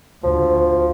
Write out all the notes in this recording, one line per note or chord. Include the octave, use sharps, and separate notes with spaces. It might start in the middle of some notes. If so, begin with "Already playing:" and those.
D2 F3